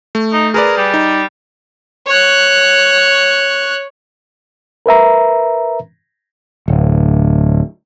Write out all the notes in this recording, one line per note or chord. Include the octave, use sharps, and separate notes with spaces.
A3
D#4
G#4 A#4 B4 D5
G3
D#4
C#5 F#6
A#4 B4 E5 A#5
D1